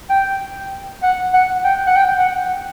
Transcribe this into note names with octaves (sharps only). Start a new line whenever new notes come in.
G5
F#5
F#5
G5
F#5
G5
F#5